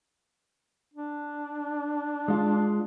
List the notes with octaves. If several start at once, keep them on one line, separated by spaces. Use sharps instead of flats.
D4
G#3 F4